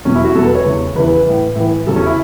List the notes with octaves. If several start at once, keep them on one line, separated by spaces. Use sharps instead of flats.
E2 B2 F#3 C#4
E4
F#4
E2 B2 F#3 A4
B4
C#5
E2 C#3 E3
E2 C#3 E3 B4
A2 E3
A2 E3
E2 C#3 F#3 A4
C#4
E4